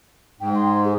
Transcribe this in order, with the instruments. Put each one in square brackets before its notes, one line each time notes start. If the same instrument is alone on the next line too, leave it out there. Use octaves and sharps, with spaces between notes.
[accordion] G#2 [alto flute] G5
[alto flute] C6
G#4